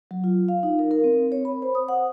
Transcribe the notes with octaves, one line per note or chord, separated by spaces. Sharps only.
F#3
F4
F5
D#4
A#4
A#4
C4
C#5
B5
C5
D#6
F#5